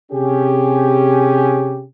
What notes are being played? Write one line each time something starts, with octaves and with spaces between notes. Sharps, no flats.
C3 C#4 G4 G#4